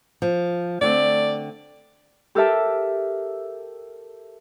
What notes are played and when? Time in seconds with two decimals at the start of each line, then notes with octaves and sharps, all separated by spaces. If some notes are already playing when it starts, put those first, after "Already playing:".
0.22 F3
0.81 D3 A3 C4 D5
2.35 G4 A4 A#4 E5 A5